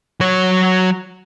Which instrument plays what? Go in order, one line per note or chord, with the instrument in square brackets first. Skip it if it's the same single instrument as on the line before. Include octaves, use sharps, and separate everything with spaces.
[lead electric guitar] F#3 C#5